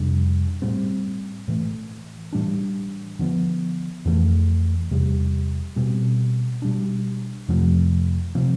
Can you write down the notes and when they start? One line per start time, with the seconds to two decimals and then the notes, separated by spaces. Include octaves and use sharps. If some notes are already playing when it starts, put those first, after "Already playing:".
Already playing: F2 C3 G3 D4
0.62 A2 G3 C4
1.48 A2 E3 A3
2.33 A2 E3 G3 D4
3.19 D3 F3 B3
4.05 F2 E3 A3
4.91 E2 C3 G3
5.76 B2 G3 C4
6.62 B2 G3 D4
7.48 F2 C3 F3 A3
8.35 C3 F3 C4